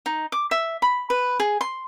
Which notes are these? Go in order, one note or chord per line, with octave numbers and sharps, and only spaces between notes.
D#4
D6
E5
B5
B4
G#4
C6